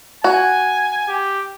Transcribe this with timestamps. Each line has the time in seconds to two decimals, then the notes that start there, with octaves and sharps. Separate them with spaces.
0.24 F#4 G#5
1.09 G4